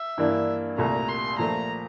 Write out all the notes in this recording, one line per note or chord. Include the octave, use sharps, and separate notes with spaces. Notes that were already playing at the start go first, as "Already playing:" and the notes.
Already playing: E5
G2 E3 A#3 D4
C2 A#2 A3 A#5
C6
A#2 F3 A3 A#5